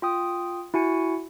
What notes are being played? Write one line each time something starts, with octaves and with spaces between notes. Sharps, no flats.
F4 G5 D#6
E4 F#4 G#5 C#7